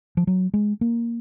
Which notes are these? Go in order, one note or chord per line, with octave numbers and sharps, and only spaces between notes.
F3
F#3
G#3
A#3